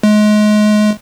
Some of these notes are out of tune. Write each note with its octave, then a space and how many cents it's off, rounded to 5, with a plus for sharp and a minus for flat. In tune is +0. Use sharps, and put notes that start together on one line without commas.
G#3 +30